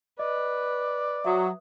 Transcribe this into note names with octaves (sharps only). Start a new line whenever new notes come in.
B4 D5 D#5
F#3 E5 D6 D#6